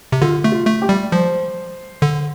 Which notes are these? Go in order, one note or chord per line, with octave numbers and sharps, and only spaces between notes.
C3
D3 F4
A3
F4
A3
G4
G3
F3 C5
D3